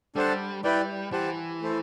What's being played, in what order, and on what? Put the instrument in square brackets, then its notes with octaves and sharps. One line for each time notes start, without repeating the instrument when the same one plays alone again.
[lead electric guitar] G3 [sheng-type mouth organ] D4 A4 C5 F#5 A5
[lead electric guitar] G3 [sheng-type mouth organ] E4 B4 D5 G5
[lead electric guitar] E3 [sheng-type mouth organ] G4 C5 F#5 A5
[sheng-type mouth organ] A3 E4 A4 C5